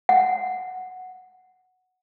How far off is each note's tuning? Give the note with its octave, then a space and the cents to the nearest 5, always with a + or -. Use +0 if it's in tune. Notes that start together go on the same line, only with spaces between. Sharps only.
F#5 -5